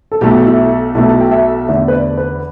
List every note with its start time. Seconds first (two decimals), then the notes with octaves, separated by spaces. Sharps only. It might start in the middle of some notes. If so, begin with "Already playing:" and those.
0.12 A4
0.21 B1 B2 A3 G4
0.46 E4
0.95 B1 B2 A3 E4
1.09 A5
1.21 G5
1.31 E5
1.68 E2 D3 A3 E5
1.88 B4
1.93 D5
2.17 B4